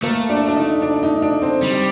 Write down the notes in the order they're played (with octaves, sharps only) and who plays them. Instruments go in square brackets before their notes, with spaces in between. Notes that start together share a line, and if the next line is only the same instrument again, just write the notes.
[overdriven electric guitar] A3 [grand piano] A#3
[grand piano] D4
D4
D#4
D4
D#4
D4
C4
[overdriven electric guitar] G3